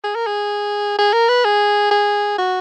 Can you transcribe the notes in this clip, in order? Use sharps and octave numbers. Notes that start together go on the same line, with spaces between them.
G#4
A#4
G#4
G#4
A#4
B4
G#4
G#4
F#4